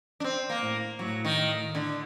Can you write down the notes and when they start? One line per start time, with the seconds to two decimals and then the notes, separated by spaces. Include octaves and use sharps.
0.20 D4
0.24 C4
0.50 A#3
0.62 A2
0.99 A2 F#3
1.25 D#3
1.75 D3